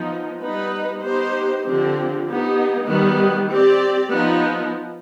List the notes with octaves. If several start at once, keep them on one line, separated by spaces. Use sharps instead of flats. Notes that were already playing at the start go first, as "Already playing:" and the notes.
Already playing: F3 B3 D#4
G3 B3 D#4 B4
B3 D#4 G4 C5
D3 F3 C4 G4
B3 D#4 G4
D#3 G3 B3
C4 G4 D5
F3 B3 D#4